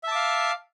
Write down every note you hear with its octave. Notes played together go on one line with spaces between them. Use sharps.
E5 F5 A5 D6